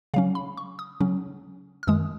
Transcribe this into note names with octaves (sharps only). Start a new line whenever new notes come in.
C#3 F#3 C#4 F5
B5
C#6
D#6
C#3 F#3 C#4
F6
F#2 D#3 G#3 D#6